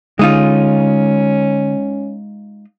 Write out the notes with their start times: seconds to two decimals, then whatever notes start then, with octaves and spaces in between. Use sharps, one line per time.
0.19 D3 G#3 C#4 D#4 F4